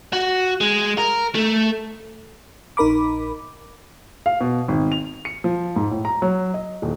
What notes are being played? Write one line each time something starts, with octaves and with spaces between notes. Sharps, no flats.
F#4
G#3
A#4
A3
A#1 D#4 A#4 B5 D6
F5
B2
G#1
F7
C#7
F3
G#2
A2
A#5
F#3
D#5
D#1